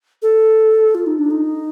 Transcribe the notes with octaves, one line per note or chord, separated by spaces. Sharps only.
A4
F4
D#4
D4
D#4